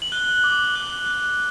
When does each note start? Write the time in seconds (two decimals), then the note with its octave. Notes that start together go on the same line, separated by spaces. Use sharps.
0.02 F#7
0.12 F#6 G7
0.44 D6
0.75 F#6
1.07 F#6